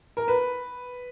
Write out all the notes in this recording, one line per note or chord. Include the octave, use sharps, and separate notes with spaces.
A#4
B4